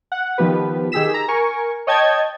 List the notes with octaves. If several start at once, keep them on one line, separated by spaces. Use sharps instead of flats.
F#5
D#3 F3 B3 G4 B4
D#3 G4 G#4 E6 B6 E7
A#5
A#4 G#5 C#6
C#5 D#5 G5 A5 G#6